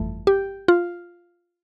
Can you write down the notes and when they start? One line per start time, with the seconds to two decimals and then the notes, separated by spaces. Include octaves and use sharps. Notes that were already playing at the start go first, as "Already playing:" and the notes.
Already playing: G1 F2 E3 A3
0.27 G4
0.68 F4